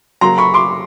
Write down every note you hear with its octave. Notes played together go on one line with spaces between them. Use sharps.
C#3 F#3 A#3 A#5 C6
B5 C#6
C6 D6